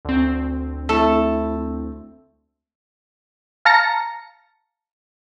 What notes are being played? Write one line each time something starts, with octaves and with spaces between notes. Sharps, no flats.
D2 C4
A3 E4 A4
F5 A5 A#5 A#6 C#7